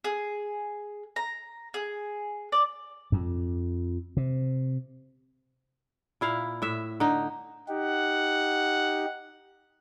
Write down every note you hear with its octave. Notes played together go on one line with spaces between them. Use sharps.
G#4
A#5
G#4
D5
F2
C3
A#2 E4 F5
A2 E5
D3 D#4
D#4 G4 F#5